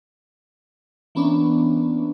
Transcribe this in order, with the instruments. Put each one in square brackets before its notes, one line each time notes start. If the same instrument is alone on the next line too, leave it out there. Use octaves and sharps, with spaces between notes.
[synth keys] E3 A#3 B3 C#4 D4